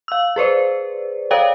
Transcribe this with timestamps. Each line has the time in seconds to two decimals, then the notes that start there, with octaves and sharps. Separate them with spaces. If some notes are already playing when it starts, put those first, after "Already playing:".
0.08 F5 E6
0.36 G#4 B4 C5 D5
1.31 A4 C#5 D5 F5 G5